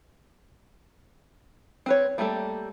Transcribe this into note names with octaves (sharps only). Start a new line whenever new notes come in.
C4 B4 C#5
G3 A3 A#3 G4 A4